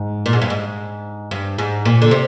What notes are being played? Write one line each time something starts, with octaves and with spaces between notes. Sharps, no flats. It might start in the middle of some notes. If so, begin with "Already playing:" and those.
Already playing: G#2
A#2
G#2
G2
G#2
G2
G#2
A#2
D3
C3